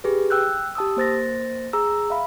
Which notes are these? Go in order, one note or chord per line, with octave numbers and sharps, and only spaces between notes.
G4 G#4 B4
G5 E6 F#6 G6
G4 A5 D#6 E6
A#3 C5 A6 A#6
G#4 A#5 E6
E5 F5 B5